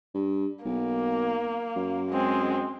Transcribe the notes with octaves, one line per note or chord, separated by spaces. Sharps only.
G2
B1 A#3
F#2
G#3 C4